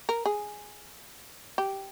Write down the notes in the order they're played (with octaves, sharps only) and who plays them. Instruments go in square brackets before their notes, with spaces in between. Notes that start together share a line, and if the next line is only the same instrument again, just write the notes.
[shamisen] A#4
G#4
G4